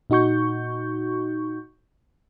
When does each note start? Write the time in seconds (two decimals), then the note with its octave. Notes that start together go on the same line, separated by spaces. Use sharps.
0.10 A#2 D#4 F#4 C#6 G6